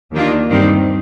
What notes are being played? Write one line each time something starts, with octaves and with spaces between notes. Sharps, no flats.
D#2 D#3 A#3 D4 F4
G2 D#3 G3 C4